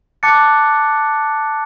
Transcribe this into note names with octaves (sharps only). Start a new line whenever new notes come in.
A5 D6 F#6 A6 C#7